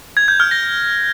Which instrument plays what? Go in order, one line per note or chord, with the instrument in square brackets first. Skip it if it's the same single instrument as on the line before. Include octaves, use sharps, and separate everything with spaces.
[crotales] G#6
G6
F6
A#6